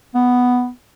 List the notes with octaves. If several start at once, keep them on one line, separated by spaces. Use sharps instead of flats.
B3